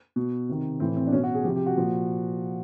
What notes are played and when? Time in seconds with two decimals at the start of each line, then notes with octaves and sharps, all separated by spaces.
0.16 B2
0.49 C3 D#3
0.80 A2 E3 C4
0.96 C4
1.07 D4
1.12 B2 C#4
1.24 F#4
1.34 G#4
1.44 C3 F3 G4
1.56 G4
1.66 F#4
1.77 A#2 F3